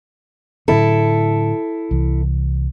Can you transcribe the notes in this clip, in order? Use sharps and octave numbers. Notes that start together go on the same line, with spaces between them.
A2 D3 F#3 E4 A4
C2 E3